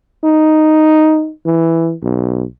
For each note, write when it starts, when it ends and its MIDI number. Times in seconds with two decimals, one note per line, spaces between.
0.24 1.31 63
1.46 1.94 52
2.03 2.43 35